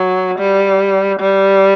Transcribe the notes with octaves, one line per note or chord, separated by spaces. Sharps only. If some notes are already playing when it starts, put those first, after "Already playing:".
Already playing: F#3
G3
G3